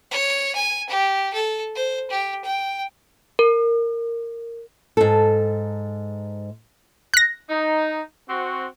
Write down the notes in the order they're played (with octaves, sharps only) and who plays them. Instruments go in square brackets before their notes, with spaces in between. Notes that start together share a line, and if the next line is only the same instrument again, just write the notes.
[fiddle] C#5
G#5
G4
A4
C5
G4
G5
[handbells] A#4
[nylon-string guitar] G#2 A4
[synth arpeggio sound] F#6 A#6
[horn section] D#4
C4 F#4